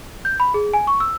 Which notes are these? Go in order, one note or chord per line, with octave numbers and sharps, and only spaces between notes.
G6
B5
G#4
G#5
C#6
E6